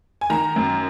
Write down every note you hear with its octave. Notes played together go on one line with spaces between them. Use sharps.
G#5
D#3 A#5
F#2